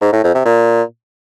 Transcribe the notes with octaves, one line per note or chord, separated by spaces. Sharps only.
G#2
A2
F2
C3
A#2